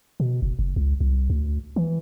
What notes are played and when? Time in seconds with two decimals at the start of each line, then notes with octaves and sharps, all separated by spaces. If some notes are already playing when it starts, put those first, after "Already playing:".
0.20 B2
0.42 F#1
0.59 F#1
0.76 C#2
1.00 C2
1.30 D2
1.76 E3